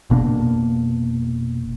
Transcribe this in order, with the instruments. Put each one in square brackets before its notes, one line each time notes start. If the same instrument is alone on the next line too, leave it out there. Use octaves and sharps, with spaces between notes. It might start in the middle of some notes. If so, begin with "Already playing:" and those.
[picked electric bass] F1 B2 A#3 D4